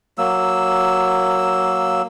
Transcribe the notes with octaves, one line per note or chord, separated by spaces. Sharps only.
F#3 A#3 E6